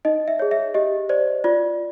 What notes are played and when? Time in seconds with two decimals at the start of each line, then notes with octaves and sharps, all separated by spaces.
0.05 D#4 D#5
0.28 E5
0.39 G#4 C#5
0.51 E5
0.74 G4 D#5
1.09 C5 D5
1.44 F4 D5